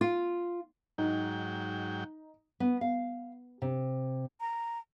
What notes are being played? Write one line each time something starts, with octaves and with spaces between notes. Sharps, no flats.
F4
G#2 F#3 D#4 G5
B3
F5
C3
A#5